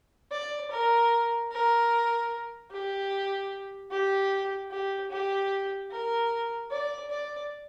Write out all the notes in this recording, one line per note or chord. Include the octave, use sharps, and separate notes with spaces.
D5
A#4
A#4
G4
G4
G4
G4
A#4
D5
D5